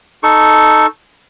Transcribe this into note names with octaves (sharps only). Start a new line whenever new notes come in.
D#4 A4 C#6